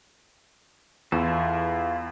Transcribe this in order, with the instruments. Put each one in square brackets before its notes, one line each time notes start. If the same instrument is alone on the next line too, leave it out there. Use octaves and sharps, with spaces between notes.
[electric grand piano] E2 [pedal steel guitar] E4 F4 A4